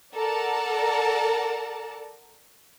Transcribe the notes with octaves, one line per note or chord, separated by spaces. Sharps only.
A4 A#4 D5 F#5 A5 A#5